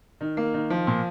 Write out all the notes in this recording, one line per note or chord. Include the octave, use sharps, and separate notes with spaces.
D#3
A#3
D#3
F3
A#2